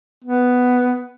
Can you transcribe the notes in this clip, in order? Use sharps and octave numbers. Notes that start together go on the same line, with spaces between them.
B3